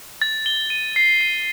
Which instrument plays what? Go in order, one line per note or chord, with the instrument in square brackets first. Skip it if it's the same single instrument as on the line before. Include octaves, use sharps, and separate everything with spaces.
[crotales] A6
G7
D#7
C7
D#7